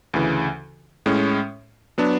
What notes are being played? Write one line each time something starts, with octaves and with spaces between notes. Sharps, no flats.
D2 C#3 E3
A2 G#3 C#4
F#3 B3 D4